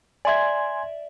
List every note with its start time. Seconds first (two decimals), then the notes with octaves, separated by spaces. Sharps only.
0.25 D5 E5 G#5 C6 G#6